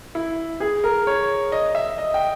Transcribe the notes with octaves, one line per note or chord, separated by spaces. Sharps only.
E4
G#4
A#4
C#5
D#5
E5
D#5
G5